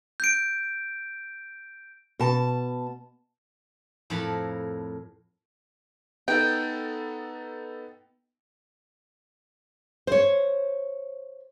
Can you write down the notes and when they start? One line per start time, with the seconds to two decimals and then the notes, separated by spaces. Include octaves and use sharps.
0.20 G6 D7
2.19 B2 A5
4.10 F2 A2 A#4 A5 B5
6.28 B3 D#4 A4 G5
10.07 C5 C#5